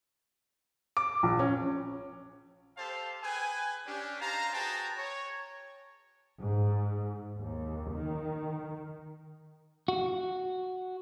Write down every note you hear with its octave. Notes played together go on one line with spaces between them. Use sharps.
D6
A#1
C#4
G4 A4 C5 F5 A5
G#4 B4 G5 G#5
C#4 D4 G4
D#4 C5 F5 A5 A#5
F#4 G#4 B4 G5 A5 A#5
C#5
G#2
D#2
D#3
F#4